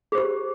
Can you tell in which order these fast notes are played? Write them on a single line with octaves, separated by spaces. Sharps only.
G#4 C5 G4